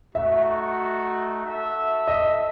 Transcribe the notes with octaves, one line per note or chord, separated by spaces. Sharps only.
A3 D#4 F#4 E5
F#4 A4 E5
D#5